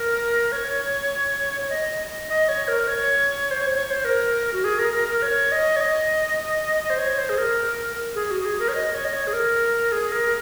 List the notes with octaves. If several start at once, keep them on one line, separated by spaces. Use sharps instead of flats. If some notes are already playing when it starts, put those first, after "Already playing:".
Already playing: A#4
C#5
C#5
D#5
D#5
C#5
A#4
C#5
C5
C#5
C#5
C5
A#4
F#4
G#4
A#4
A#4
A#4
C#5
D#5
C#5
D#5
C5
C#5
C5
G#4
A#4
G#4
F#4
G#4
A#4
C#5
D#5
C#5
D#5
C#5
G#4
A#4
G#4
A#4